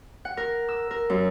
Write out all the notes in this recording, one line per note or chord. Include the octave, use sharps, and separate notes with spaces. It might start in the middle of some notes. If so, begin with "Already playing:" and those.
F#5
A#4
E6
A#4
F#2